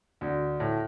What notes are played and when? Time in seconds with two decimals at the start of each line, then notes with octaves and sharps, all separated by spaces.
0.21 D2
0.60 A2